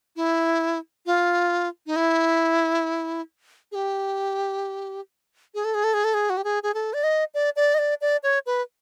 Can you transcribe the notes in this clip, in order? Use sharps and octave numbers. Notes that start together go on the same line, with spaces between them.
E4
F4
D#4
E4
G#4
G4
G#4
A4
G#4
A4
G#4
A4
G#4
F#4
G4
G#4
G#4
A4
D5
D#5
D5
D5
D#5
D5
D5
C#5
B4